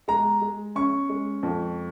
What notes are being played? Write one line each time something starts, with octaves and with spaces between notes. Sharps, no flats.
G#3 A#5
G#3
C#4 C#6
G#3
F2